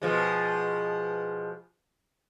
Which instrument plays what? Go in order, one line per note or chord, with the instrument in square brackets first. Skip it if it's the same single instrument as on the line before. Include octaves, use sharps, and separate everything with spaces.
[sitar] B2 F3 G#3